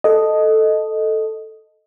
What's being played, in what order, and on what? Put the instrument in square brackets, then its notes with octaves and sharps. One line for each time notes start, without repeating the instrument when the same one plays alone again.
[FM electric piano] A4 D#5